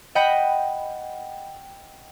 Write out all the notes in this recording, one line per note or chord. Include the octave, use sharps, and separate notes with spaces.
D#5 F#5 G5 B5 A#6 B6